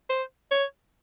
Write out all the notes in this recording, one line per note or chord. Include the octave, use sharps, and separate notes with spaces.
C5
C#5